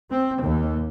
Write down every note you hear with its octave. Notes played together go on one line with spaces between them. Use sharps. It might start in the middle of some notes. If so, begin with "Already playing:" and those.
C4
D#2